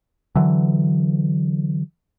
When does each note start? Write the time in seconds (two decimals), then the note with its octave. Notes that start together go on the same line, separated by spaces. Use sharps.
0.36 D3 E3 F#3